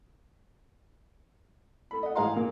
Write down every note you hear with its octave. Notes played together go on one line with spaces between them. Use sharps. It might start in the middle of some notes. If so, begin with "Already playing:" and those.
A4 B5
D#5 F#5
A1 G#2 G#4 F5 A#5 C6
A#2 A#4